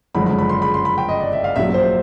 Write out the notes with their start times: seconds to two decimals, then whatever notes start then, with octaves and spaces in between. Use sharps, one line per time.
0.15 F#1 F#2 D3 F3 G#3 B5
0.26 B5
0.38 B5
0.49 C6
0.62 B5
0.74 C6
0.85 B5
0.98 G5
1.09 D#5
1.20 D5
1.33 E5
1.44 F5
1.56 A#1 A#2 F#3 E5
1.74 C5